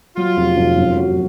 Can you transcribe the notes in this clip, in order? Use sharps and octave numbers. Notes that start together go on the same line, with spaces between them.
F#3 F4
F1
F1
F#2
F#3